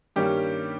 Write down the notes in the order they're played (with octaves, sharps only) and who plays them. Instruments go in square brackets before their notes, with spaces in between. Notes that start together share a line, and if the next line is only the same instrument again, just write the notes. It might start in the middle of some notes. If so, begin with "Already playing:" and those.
[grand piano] G2 D#3 G3 A#3 C#4 G4